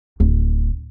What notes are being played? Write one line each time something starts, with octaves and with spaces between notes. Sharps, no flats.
D1